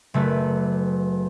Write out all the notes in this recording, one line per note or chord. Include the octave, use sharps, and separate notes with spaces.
F#1 A3 B4